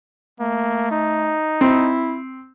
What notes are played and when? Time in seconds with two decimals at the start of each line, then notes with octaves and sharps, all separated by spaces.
0.40 A3 A#3
0.92 D#4
1.61 C4 E4